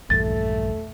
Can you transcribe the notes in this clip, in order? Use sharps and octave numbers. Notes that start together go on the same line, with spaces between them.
A#1 E2 G2 A3 A6